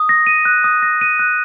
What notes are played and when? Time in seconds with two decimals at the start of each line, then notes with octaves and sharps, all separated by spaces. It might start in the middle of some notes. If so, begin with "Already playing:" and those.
Already playing: D#6
0.09 A#6
0.27 D#7
0.45 F#6
0.64 D#6
0.83 A#6
1.01 D#7
1.19 F#6